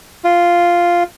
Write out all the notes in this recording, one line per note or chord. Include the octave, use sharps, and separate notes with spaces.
F4